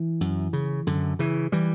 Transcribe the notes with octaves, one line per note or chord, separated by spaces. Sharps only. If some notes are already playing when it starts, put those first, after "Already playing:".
Already playing: E3
F#2
C#3
F#2 D3
C#3 E3
E3 G3